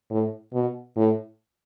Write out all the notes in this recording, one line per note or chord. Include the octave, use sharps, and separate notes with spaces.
A2
B2
A2